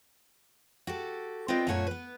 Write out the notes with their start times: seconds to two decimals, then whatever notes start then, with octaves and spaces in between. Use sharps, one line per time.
0.87 F#4 G4 A4
1.48 C4 F4 B4 D5 D#5 G5
1.67 F#2 A#2 A3 F#4 C#5 G#5
1.87 B3 B4